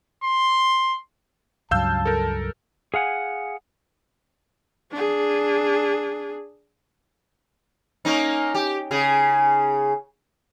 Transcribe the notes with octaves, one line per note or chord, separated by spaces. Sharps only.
C6
C#2 G2 F#3 F5 A5 E6 G6
A4 A#4
G#4 F5 F#5 G#5
D4 G#4
A#3 C#4 D#4
G4
C#3 G#4